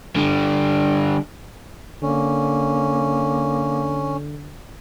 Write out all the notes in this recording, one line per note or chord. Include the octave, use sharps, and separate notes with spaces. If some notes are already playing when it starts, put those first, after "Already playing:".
D3 G3
D3 A#3 C#4